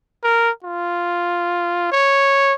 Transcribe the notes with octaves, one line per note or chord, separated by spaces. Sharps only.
A#4
F4
C#5